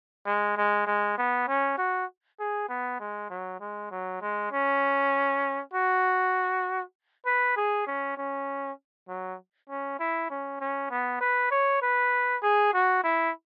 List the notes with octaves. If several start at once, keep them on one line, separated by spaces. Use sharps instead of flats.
G#3
G#3
G#3
B3
C#4
F#4
G#4
B3
G#3
F#3
G#3
F#3
G#3
C#4
F#4
B4
G#4
C#4
C#4
F#3
C#4
E4
C#4
C#4
B3
B4
C#5
B4
G#4
F#4
E4